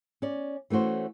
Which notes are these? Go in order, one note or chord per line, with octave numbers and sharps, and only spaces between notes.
C#4 D5
E3 A3 C#4 F#4 C5